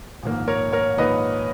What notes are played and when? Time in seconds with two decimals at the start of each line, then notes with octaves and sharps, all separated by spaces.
0.23 A#1 G#2 D#3 A#3
0.48 A#4 C#5
0.72 A#4 C#5
0.98 A#1 G#2 D#3 A#3 B4 D#5